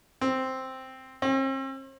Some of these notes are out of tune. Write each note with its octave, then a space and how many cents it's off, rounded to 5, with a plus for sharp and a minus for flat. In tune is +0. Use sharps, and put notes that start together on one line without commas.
C4 +0
C4 +45